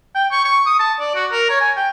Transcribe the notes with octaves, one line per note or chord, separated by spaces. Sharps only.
G5
C#6
C#6
D#6
A5
D5
F#4
A#4
C#5
G#5
G5